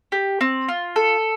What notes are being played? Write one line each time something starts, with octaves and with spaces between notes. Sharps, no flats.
G4
C4
F4
A4